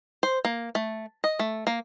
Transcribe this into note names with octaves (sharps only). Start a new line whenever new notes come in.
C5
A#3
A3
D#5
A3
A#3